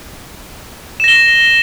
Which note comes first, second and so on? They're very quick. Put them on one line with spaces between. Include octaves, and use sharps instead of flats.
E7 A#6 G7